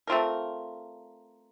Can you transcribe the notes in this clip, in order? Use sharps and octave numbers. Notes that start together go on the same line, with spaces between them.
A3 C4 F4 A#4